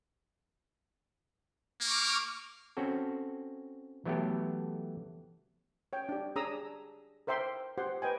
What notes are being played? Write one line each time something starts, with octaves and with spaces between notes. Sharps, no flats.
A#3 C#6 D6 F6
C4 C#4 F#4 A4
E3 F#3 A3 B3 G4 A4
C#5 G5
D4 G4
D4 G#4 C#5 A#5 D#6 E6
A#4 C5 E5 G5 C6
G4 C5 F#5 C6
B4 D#5 G5 G#5